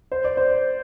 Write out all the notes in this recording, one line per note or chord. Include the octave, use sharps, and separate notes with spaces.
C5
D5
C5